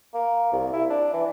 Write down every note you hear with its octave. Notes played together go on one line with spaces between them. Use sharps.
A#3
C2
E4
D4
E3